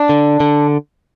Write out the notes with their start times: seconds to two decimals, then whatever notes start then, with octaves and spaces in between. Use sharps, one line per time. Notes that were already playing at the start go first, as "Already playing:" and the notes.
Already playing: D4
0.09 D3
0.40 D3